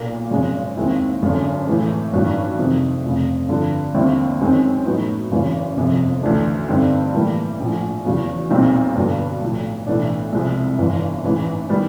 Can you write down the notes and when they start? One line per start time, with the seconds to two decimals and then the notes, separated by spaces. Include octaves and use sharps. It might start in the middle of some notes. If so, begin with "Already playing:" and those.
Already playing: B1 A#2 A#3
0.31 G#1 F#2 C#3 F3 G#3
0.76 D#2 D#3 G#3 C4 E4
1.22 G#1 F#2 D3
1.67 A2 E3 G#3
2.13 A1 G2 D#3 F#3
2.58 F2 C3 D#3
3.03 F1 F2 C#3
3.49 G2 D3 F3
3.94 D#2 D3 G3 C4 E4
4.41 F#2 D#3 G#3 C4 D#4
4.86 A2 F#3 B3 D#4
5.31 G#1 F#2 C#3 E3
5.77 G1 F2 C3 F3
6.23 D2 C#3 E3 A3 D4
6.68 G2 D3 G3 C4 D#4
7.14 A2 E3 G3 A#3
7.60 A#1 A2 F3
8.05 E2 C#3 F#3
8.50 B1 A#2 G3 C4 D#4
8.95 G2 D3 F#3 B3
9.41 B1 A2 F3
9.87 B1 A2 E3 A3 D4
10.32 C2 C3 F3 G#3
10.79 G1 G2 E3
11.24 A1 G#2 E3
11.69 D#3 G3 B3